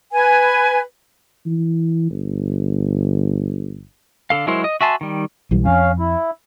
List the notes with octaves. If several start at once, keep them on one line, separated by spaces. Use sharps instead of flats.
B4 G#5
E3
G1
D3 A4 F5
F#3 G#3 E4 A#4 C5
D#5
F#4 E5 G#5 A5 C6
D#3 G3
B1 E3 G3
F2 C#4 F5
E4